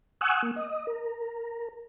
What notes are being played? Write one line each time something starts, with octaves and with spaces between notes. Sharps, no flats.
F#5 G#5 C#6 D#6 E6 F#6
A#3
D#5
A#4